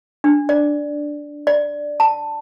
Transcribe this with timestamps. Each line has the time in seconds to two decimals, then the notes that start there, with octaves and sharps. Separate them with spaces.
0.24 D4
0.49 D5
1.47 D5
2.00 A5